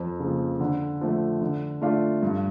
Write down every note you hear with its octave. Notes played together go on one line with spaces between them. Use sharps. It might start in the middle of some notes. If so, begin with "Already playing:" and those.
Already playing: F2
C#3 F3 A#3
D3
F3 A3
D3
A3 D4 F4
G2